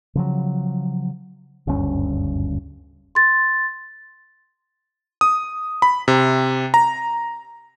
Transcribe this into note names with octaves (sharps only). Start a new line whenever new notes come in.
C#3 F3 F#3
F#1 D2 G2 C#4
C6 A6
D#6
B5
C3
A#5